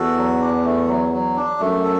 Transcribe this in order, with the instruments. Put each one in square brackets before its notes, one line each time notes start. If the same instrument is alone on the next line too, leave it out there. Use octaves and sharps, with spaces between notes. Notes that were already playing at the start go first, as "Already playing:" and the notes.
Already playing: [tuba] E2 [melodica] F#4 A4
[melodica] F#3
D4
A3
F#3
F#3
D4
[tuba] F#2 [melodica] A3
[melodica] A4